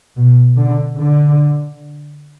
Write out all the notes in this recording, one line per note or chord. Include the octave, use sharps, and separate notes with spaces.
B2
D3
D3